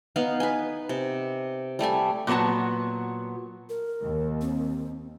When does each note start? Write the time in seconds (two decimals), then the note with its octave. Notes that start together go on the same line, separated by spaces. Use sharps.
0.16 B3 D#4 F5
0.40 B4 G#5
0.89 C3
1.79 G3 A3 G4 G#5
2.27 A#2 F#3 B3 F#4 A5
3.70 A#4
4.01 D#2
4.41 C4